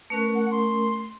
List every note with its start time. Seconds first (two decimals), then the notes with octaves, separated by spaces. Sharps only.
0.10 A3 C#4 A#4 B4
0.34 F#5
0.51 C6